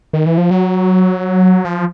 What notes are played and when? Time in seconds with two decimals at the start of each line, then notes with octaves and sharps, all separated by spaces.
0.13 D#3
0.26 E3
0.38 F3
0.51 F#3
1.65 F3